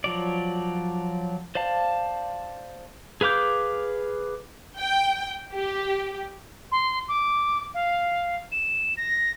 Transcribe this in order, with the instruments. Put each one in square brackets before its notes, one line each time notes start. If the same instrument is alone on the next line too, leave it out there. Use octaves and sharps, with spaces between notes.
[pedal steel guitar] F3 F#3 D5
C5 D5 F5 A5
G#4 B4 F5 D6 G6
[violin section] G5
G4
[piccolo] C6
D6
F5
E7
A#6